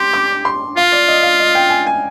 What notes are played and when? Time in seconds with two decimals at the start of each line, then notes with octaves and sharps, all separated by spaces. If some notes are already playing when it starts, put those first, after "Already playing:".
Already playing: G4 C6
0.14 D6
0.45 C6
0.77 F4 F5
0.92 D5
1.08 D#5
1.23 F5
1.39 D#5
1.55 G5
1.70 G#5
1.87 G#5